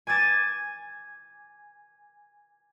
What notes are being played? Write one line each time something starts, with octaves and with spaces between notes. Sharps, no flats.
G#5 D6 G#6 A6 D#7 E7